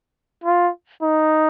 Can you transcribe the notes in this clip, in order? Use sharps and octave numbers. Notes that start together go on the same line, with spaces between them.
F4
D#4